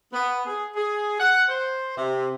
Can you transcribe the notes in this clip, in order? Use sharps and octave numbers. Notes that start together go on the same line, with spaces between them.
B3
G#4
G#4
F#5
C5
C3